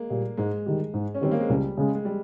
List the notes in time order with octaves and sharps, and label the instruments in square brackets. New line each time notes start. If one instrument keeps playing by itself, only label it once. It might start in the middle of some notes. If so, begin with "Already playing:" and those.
Already playing: [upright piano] G#3 A#3
[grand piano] A#2 G3
[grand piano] G#2 [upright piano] G#3
[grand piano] D#3 G3
G#2
[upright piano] C#4
[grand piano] D#3 G3 [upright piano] C4
[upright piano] A#3
G#3
[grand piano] C#2 [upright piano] G3
[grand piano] C#3 G#3
[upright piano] G#3
G3